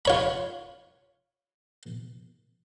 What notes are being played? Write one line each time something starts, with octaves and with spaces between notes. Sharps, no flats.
F4 C#5 B5